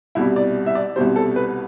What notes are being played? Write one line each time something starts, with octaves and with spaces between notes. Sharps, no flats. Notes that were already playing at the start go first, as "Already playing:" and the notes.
C2 B2 G3 E4
D5
E5
D5
C2 B2 G3 C5
A4
B4